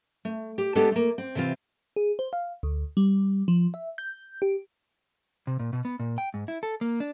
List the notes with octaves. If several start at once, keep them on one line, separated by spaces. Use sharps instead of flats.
A3
G4
G#3 B3 D4 G4 A4
A3 A#3
C4
C3 E3 C4 F4
G#4
C5
F5
D2
G3
F3
E5
G6
G4
C3
A#2
B2
B3
A#2
G5
G#2
E4
A4
A#3
D4